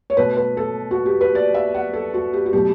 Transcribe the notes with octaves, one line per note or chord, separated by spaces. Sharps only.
C#5
B2 A3 B4
B4
A4
F#4
G4
B4
D5
E5
F#5
A4
F#4
G4
F#4
B2 F#3 A3 G4